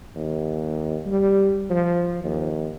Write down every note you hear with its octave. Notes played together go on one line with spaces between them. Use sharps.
D#2
G3
F3
D#2